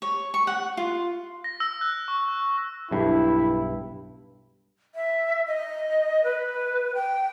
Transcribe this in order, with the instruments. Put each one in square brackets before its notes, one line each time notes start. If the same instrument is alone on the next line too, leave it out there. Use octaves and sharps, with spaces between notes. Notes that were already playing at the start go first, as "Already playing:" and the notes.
[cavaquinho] C#5
C#6
F#5
F4
[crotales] A#6
E6
F#6
C#6
F#6
[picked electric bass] B1 G2 [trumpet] E4
[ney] E5
D#5
B4
G5